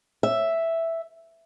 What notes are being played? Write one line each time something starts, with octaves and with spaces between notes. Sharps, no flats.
E5